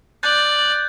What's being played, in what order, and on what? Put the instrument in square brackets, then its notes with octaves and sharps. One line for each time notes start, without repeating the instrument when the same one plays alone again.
[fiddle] D5 [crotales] F#6 G6 A6